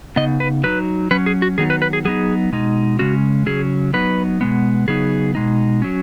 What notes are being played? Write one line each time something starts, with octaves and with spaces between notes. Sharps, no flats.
C#3 B3 D#4 D#5
B4
F#3 D#4 B4
F#3 C#4 B4
G#4
F#4
D#3 F#3 B3 D#4 G#4
B4
B4
G#4
F#3 B3 D#4 G#4
B2 G#3 D#4
C#3 G#3 C#4 F#4
C#3 F#3 C#4 G#4
F#3 B3 D#4 B4
B2 G#3 B3
C#3 F#3 B3 D#4 G#4
B2 G#3 D#4
F#3 C#4